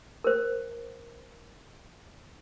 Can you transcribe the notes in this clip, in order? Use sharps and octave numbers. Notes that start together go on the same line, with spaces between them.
A#4 C5